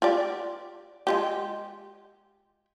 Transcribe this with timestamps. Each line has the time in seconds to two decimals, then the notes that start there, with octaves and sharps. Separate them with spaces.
0.02 F4 G4 D5
1.07 G#3 F4 G4